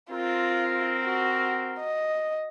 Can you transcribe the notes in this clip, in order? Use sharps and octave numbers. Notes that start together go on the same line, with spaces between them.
C4 F4 A#4
F#4
D#5